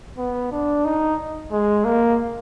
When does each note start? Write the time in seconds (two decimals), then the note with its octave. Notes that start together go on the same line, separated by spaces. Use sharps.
0.18 B3
0.52 D4
0.85 D#4
1.52 G#3
1.85 A#3